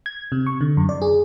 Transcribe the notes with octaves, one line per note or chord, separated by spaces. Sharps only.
G#6
C3
C#6
D3
F#2
D5
G#4